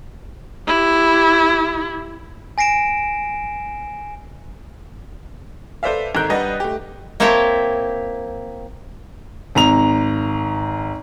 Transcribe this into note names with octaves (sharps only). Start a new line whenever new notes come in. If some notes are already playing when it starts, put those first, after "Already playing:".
E4 G4
G#5 A#6 C7 D7 E7
A4 B4 C5 D5 E5 F5
G#1 D#4 A4 A#4 F#6 G6
G3 D4 B4 D#5 F#5
A3 G4
A#3 C4 E4 C#5 G5 A5
G#1 A#5 F7